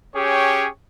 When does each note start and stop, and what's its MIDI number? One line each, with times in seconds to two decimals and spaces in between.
0.15 0.68 61
0.15 0.68 67
0.15 0.68 68
0.15 0.68 73
0.15 0.68 79